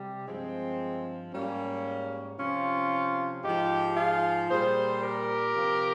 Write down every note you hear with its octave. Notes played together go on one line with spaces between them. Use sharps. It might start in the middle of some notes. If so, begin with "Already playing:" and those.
Already playing: C3 G3
G2 F3 G#3 C4
G#2 G3 A#3 C#4
C3 F3 C#4 F4
G#2 F3 D#4 G4
F4 G#4
A#2 G3 G#4 C5
G4 A#4
C3 F3